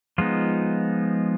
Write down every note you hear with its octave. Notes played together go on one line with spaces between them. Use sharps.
F3 G#3 B3 D#4 F4